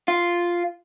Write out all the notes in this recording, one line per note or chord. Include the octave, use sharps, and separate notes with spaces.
F4